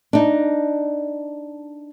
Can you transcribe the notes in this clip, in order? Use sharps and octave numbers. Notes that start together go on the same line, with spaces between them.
D4 D#4